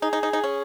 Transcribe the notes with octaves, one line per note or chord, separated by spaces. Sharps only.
D#4 G#4
D#4
D#4
D#4
C#4